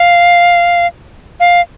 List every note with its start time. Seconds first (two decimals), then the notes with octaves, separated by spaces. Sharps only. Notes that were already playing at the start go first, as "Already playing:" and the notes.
Already playing: F5
1.40 F5